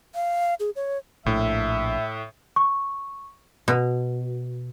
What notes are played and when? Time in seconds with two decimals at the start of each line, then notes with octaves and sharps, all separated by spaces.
0.15 F5
0.60 G#4
0.76 C#5
1.26 A#1 A2 E5
2.56 C#6
3.68 B2